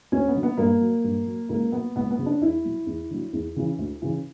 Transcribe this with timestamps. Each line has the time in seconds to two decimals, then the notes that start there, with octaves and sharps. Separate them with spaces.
0.12 D2 C#4
0.28 B3
0.35 D3 F#3
0.43 B3
0.57 G2 A#3
0.81 F#3
1.04 G2
1.27 F#3
1.49 C#2 A#3
1.72 B2 F#3 B3
1.96 C#2 B3
2.11 B3
2.19 C#3 F#3
2.26 D4
2.41 E2 E4
2.65 B2 F#3
2.87 E2
3.11 D3 F#3
3.33 E2
3.57 C#3 E3
3.78 D2
4.02 C#3 E3